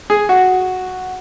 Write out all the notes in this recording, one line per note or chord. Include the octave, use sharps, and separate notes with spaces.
G#4
F#4